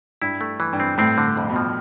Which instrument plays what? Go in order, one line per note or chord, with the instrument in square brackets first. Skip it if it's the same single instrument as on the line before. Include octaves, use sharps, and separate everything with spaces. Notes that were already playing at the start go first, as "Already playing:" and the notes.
[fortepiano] G2 [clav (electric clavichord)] E4
[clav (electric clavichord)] A3
E3
[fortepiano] G2
[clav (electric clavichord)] C4
[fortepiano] A2 [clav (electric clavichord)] C4
[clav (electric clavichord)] D3
F2
[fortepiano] B2
[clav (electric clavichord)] F3